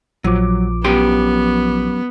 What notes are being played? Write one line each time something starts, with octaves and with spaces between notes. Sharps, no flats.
A#1 F3 F#3 D6
F#2 B3 G4 C6